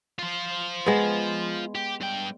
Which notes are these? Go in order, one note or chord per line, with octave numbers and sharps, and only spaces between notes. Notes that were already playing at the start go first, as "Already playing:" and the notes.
F4 C5
G#3 B3
G4
G2 G5